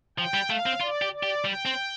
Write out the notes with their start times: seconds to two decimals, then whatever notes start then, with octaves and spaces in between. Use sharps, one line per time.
0.18 F3 G5
0.34 G3
0.49 A3 F5
0.66 C4
0.81 F4 D5
1.02 G4
1.13 D5
1.23 G4
1.44 G3 G5
1.66 C4